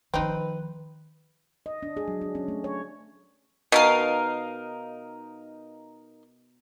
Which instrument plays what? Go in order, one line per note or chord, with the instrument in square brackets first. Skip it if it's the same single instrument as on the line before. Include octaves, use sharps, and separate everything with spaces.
[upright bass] D#3 F3 [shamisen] C4 D#4 [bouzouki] B4
[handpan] D#5
D4
G#4
F#3
D4
C#4
A3
C#5
[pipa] B2 [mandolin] D#4 A#4 F5